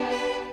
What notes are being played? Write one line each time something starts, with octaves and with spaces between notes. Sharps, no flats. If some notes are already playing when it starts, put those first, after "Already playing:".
Already playing: B3 D4 G4
B4